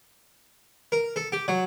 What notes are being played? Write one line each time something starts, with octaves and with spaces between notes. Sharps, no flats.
A#4
A4
G4
F#3